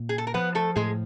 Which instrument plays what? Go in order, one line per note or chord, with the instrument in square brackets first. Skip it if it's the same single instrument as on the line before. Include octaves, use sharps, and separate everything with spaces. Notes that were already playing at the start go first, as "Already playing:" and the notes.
Already playing: [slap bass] A#2
[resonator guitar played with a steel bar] G#4
A4
A#4
[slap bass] F3 [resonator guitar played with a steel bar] B3 B4
[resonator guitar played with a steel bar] A3 A4
[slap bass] A2 [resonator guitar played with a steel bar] G#3 G#4